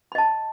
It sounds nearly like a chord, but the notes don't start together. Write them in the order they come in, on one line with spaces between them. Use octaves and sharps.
B5 D#5 A5